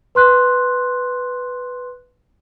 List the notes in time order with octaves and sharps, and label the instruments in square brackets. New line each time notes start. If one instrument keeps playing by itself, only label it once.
[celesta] B4 C6 F#6